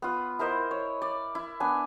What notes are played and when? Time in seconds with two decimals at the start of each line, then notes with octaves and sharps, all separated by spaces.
0.02 B3 F4
0.39 E4 A#4 C5 D#5
0.71 C#5
1.02 D5
1.35 E4
1.60 B3 D4 G#5